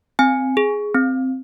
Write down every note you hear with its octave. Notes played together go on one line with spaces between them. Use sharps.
C4 G#5
G#4
C4